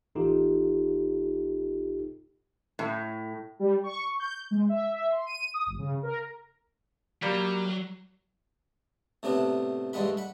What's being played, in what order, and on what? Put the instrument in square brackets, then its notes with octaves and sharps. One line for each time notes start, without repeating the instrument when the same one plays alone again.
[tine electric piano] A1 D#4 F4 G4 A4
[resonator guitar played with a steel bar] A2
[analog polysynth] G3
C#6
G6
G#3
E5
E5
C6
D#7
D#6
G1
C#3
A#4
[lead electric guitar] F#3 [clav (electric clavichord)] G3 A#3 G4
[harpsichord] A2 C3 B3 D4
D2 G2 D3 G#3 F#5 B5
F#5 B5